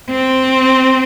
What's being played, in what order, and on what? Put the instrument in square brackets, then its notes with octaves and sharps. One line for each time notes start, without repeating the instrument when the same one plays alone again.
[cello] C4